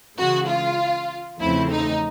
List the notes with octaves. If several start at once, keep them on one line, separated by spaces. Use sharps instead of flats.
C#3 E3 G#3 F#4
F4
E2 C#3 F3 A3 C4 E4
D#4